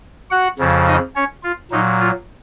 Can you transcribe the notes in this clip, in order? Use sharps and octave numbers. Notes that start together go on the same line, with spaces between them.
F#4 F#5
F2 C#3 F3
D#4 D#5
C#4 C#5
F4
A#2 F#3 D#4
F4